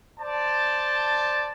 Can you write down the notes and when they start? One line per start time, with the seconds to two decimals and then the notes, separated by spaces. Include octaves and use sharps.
0.19 C5 D5 A5